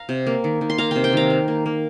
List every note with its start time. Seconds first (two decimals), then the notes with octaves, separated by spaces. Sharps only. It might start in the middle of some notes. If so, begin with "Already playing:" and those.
Already playing: F5 A#5
0.09 C3
0.27 A#3
0.44 D#3
0.61 D#3
0.70 C6
0.78 A#3 F5 A#5
0.91 C3 G5 C6
1.04 G5 C6
1.13 D#3 F5 A#5
1.30 A#3
1.48 A#3
1.66 A#3